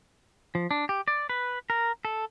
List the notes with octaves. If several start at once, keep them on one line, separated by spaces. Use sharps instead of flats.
F3
D4
G4
D5
B4
A#4
A4